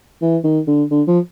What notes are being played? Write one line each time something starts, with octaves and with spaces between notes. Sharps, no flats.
E3
D#3
D3
D3
F3